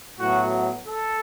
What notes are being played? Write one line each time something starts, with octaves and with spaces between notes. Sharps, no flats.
A2 F#3 B3 F#4
A4